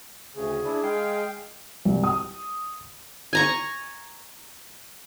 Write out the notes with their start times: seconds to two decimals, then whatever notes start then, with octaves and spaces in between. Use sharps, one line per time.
0.35 D2 C#3 G#4
0.65 D4 E4
0.83 G#3 F5 G5
1.85 C2
2.04 D#6
3.33 G#5 A#5 C#6